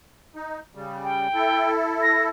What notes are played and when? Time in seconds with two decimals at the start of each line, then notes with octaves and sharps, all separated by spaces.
0.36 D#4
0.75 C#3 G3
1.04 G5
1.34 E4 A4
2.02 A#6